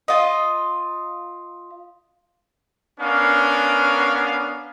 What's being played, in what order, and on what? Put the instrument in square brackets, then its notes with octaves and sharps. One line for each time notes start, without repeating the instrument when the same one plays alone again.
[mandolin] F4 D#5
[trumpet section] B3 C#4 D4 A#4 F5